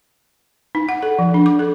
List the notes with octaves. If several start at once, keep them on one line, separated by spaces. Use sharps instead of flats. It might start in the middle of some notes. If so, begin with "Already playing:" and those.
D#4
F#5
A4
F3
D4
D6
A4